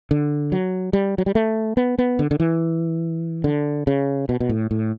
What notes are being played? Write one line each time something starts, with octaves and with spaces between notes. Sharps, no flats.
D3
F#3
G3
F#3
G3
A3
B3
B3
D3
D3
E3
D3
C#3
B2
B2
A2
A2